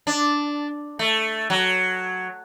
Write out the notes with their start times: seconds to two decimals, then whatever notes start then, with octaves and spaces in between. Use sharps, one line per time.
0.07 D4
0.99 A3
1.50 F#3